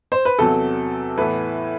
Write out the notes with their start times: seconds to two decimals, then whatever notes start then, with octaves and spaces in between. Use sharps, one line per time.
0.12 C5
0.25 B4
0.39 E2 C3 F#3 A4
1.17 A2 E3 B3 B4